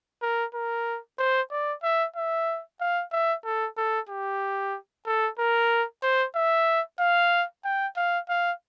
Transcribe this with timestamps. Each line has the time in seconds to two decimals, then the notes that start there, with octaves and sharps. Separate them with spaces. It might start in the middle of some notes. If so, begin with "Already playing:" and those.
0.22 A#4
0.54 A#4
1.19 C5
1.51 D5
1.83 E5
2.16 E5
2.81 F5
3.12 E5
3.45 A4
3.77 A4
4.09 G4
5.06 A4
5.39 A#4
6.03 C5
6.35 E5
6.99 F5
7.64 G5
7.96 F5
8.29 F5